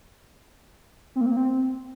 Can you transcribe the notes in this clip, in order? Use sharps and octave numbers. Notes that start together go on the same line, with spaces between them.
C4
A#3
C4
A#3
C4